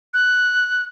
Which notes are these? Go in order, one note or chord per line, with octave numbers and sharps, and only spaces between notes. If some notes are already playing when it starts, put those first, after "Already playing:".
F#6